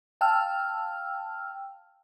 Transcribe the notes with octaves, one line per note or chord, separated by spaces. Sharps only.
F5 G5 A5 E6 F6